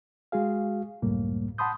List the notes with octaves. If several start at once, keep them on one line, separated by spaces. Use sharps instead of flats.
G#3 F#4 G#4 F5
C#2 F#2 A2 G3 A#3
F#5 A5 B5 C6 D#6 G6